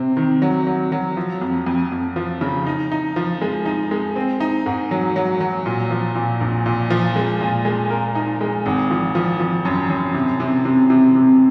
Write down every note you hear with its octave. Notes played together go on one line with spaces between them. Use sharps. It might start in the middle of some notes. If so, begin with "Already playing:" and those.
Already playing: C3 C4
D#3
F#3
F#3
F#3
F3
F2
F2
F2
F3
C#3
D#4
D#4
F3
G#3
D#4
G#3
C4
D#4
G#2
F#3
F#3
F#3
A#2
F3
A#2
A#1
A#2
F3
G#3
A#2
G#3
A#4
D#4
G#3
G#1
F3
F3
F3
F#2
F#2
C3
C3
C3
C3
C3